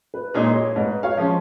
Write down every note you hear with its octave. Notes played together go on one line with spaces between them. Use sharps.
B4
A#2 G#3 D#4 G#4 C#5
C#5
G#2 B4 D#5
C#5 F5
F3 G#3 C#4